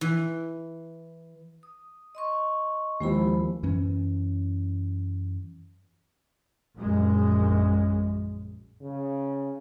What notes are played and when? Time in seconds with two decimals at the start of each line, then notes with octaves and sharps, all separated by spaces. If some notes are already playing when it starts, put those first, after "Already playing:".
0.01 E3
1.63 D#6
2.15 D#5 C6 C#6
3.00 D#2 F3 G#3 E4 B5
3.63 F#2 E3 C#4
6.76 A#1 F#2 G#3
8.81 C#3